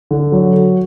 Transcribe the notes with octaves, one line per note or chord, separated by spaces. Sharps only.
D3
F#3